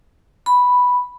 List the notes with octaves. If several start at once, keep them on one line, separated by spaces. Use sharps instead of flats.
B5